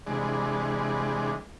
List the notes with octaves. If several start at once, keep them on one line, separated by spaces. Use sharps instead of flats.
C3 E3 G3 G#3 D4 G#4